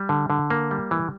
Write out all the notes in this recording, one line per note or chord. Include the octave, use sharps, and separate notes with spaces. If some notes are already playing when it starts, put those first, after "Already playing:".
Already playing: G3
D3
D3
A#3
G3
E3